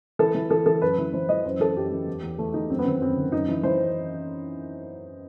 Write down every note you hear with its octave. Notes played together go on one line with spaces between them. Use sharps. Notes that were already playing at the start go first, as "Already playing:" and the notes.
E3 A4
E3
E3 A4
E3 A4
F#2 B4
E3
E3 C5
E3 D#5
F#2 C5
E3 A4
F#2 G4
E3
E2
E2
E2 A3
E2 D#4
F#2 C4
B3
D#3 C4
F#2 C4
D#3
F#2 D#4
E3
E3 C5